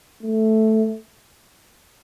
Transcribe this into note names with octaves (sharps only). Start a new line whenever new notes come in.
A3